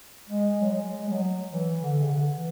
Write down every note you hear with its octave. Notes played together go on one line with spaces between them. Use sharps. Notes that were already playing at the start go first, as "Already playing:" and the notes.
G#3
F#3
G#3
G#3
F#3
E3
D3
C#3
D3
E3